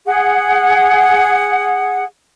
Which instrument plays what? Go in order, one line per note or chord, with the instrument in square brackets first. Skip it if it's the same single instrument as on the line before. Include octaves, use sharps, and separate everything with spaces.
[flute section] G#4 F#5